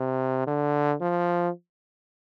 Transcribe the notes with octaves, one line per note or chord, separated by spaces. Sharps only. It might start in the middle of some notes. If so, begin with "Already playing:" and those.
Already playing: C3
D3
F3